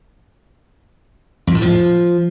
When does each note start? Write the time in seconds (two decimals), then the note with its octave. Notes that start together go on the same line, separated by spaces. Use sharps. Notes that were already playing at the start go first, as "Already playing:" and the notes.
1.47 F2
1.55 A2
1.62 F3